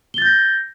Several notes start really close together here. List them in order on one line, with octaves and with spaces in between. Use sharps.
G7 A6 G6 A#6